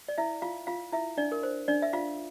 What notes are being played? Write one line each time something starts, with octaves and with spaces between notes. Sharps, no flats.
D5
E4 E5
F4 F5
F4 F5
E4 E5
D4 D5
A#4
C5
D4 D5
E5
F4 F5